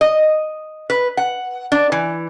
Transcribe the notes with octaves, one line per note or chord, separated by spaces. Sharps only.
D#5
B4
F#5
D4
E3